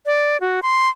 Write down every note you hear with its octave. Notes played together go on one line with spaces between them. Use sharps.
D5
F#4
C6